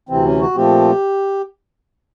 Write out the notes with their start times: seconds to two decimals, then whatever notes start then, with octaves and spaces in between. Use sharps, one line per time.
0.09 D2 C3 E3 C4
0.25 C#4
0.40 F#4
0.55 A#2 F3 A3 C4 G4